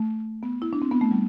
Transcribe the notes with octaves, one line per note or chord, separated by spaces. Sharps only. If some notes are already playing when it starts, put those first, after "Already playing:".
Already playing: A3
B3
E4
D4
C4
B3
A3
G3